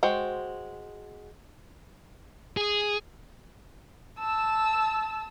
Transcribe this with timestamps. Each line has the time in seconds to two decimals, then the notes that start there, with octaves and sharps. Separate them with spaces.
0.03 G#3 F#4 C5 G5
2.57 G#4
4.19 A5 E6